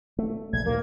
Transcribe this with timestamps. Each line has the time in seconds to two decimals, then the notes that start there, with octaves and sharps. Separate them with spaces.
0.19 A3
0.53 A#1 G#6
0.66 D2 A#3